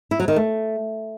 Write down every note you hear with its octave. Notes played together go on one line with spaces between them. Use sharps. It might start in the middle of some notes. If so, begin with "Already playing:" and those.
E4
F#3
D#3
A3